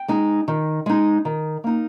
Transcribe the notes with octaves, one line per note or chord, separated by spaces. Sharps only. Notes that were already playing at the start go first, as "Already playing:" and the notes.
Already playing: G5
G#3 D#4
D#3
G#3 D#4
D#3
A#3 D#4